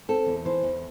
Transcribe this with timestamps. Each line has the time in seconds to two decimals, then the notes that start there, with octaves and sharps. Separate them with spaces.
0.09 C4 A4
0.26 E2
0.45 E3 C5
0.63 E2